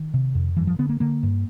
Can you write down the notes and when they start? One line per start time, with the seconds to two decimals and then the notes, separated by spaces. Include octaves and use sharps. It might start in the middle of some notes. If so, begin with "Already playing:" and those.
Already playing: D#3
0.14 C3
0.35 F2
0.57 G2 E3
0.67 F3
0.79 D3 B3
0.89 A#3
1.00 D3 A#3
1.23 G2